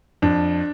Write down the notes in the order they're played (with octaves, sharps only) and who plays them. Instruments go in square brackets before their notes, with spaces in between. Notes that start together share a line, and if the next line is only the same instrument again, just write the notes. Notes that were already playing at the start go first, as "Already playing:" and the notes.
[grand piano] F2 D4